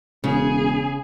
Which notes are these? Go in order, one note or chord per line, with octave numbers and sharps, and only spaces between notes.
E1 C#3 G#4